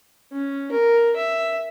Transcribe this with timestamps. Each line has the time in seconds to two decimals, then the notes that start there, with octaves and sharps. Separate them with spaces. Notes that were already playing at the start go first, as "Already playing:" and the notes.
0.32 C#4
0.72 A#4
1.16 E5